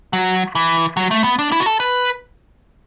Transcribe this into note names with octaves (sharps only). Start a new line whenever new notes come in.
F#3
E3
F#3
A3
B3
D4
E4
F#4
A4
B4